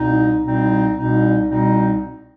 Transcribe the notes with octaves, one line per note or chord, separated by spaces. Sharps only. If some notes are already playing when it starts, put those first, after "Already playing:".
Already playing: C2 B2 G3 C4 D#4
C2 B2 G3 C4 D#4
C2 B2 G3 C4 D#4
C2 B2 G3 C4 D#4